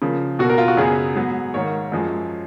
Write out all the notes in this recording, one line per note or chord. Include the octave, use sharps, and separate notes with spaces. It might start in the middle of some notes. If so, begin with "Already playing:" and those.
C#3 F3 A#3
B2 A#3 F#4
A#4
F4
F#4
F#2 C#3 F#3 B3 G#4
G#2 F#3 B3
G#2 D#3 A#3 C#5
F#2 F3 G#3